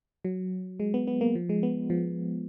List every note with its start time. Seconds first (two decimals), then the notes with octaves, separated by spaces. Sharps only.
0.25 F#3
0.80 G#3
0.94 B3
1.07 B3
1.21 A#3
1.35 F3
1.49 G#3
1.63 B3
1.90 F3